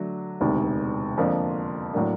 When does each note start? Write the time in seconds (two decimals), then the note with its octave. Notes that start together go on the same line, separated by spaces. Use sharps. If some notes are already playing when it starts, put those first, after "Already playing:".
Already playing: D3 F#3 A3 D4
0.41 E1 D2 C3 D#3
1.17 F2 D3 F3 A#3 D4
1.94 A2 F#3 A#3 D4